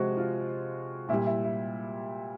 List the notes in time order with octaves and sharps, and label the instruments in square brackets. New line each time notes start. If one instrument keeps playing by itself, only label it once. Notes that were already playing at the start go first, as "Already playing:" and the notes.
Already playing: [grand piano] C3 F3 G#3 F#4
F4
A#2 E4
G3
E4
E4